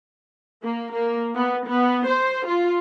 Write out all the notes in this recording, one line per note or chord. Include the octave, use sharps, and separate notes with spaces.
A#3
A#3
B3
B3
C5
F4